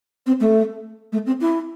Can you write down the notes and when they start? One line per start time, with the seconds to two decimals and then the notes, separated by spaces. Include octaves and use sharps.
0.26 C4
0.40 A3
1.12 A3
1.26 C4
1.40 E4